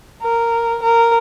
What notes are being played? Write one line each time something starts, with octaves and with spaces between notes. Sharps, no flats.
A#4
A#4